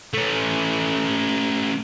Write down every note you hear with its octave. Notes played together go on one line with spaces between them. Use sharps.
A3 C#4